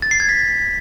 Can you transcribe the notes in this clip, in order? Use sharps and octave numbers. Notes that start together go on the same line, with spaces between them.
A6
C7
G#6
B6